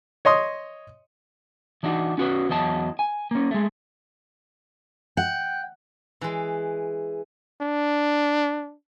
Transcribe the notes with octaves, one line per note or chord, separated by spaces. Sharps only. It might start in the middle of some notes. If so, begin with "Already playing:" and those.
C#5 D#5 C6 D#6
E3 D4 D#4 F#4
C#4 F#4 B4 C#5
E2 F#3 D#5 A5
G#5
A#3 C#4
G#3 A3
F#5 G5
E3 G#3
D4